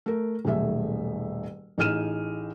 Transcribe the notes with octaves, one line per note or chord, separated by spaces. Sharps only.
A3 A#4
D#1 B1 A3 G#4 E5
A1 D#4 G#4 F6 D#7 E7